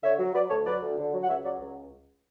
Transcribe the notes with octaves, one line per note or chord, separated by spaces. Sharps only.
D3 C#5 E5
F#3
F#3 B4 D5
D2 A4 C#5
F#3 B4 D5
D2
D3
F#3
F#5
C#2 C#5 E5
F#3 D5 F#5
C#2